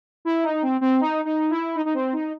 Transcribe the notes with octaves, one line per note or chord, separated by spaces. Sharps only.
E4
D#4
C4
C4
D#4
D#4
E4
D#4
D#4
C4
D#4